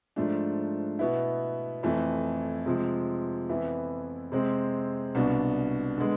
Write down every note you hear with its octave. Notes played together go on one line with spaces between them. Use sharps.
G#2 F3 A3 D4
B2 B3 E4
F2 E3 A3
C3 F3 G#3
F2 E3 B3 E4
C3 G#3 C4
C2 B2 B3 D4
D3 G#3 B3